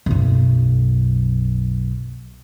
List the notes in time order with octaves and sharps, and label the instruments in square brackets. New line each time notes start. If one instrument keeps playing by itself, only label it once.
[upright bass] B1 F#2